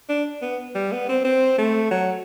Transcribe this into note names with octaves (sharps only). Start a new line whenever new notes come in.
D4
B3
G3
B3
C4
C4
A3
F#3